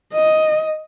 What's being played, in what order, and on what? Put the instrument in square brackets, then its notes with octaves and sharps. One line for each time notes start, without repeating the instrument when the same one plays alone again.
[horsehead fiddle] D#5